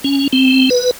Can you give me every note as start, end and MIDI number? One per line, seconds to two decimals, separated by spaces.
0.04 0.28 61
0.33 0.69 60
0.70 0.91 71